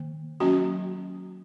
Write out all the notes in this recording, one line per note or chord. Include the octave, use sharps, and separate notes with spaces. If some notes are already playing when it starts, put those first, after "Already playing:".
Already playing: D#3 A#3
F#3 A#3 C#4 F#4